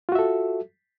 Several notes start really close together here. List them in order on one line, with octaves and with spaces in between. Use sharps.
F4 F#4 E5 A4